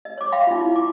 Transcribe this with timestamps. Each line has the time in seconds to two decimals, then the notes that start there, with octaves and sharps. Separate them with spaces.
0.05 D#5
0.18 C#5 D6
0.32 E5 F5 G5 B5 C6
0.47 D#4 F4
0.61 E4
0.76 D6